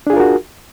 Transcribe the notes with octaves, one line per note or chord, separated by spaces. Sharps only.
D4 F4 F#4 G#4 A#4